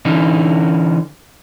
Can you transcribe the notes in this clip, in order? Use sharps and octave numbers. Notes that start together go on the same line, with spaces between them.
D3 E3 C#4 D#4